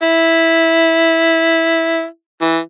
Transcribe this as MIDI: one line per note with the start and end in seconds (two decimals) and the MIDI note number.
0.03 2.04 64
2.41 2.58 52